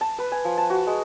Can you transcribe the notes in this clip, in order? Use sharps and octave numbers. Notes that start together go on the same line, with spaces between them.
A5
B4
G#5
F3
A5
F#4
G#3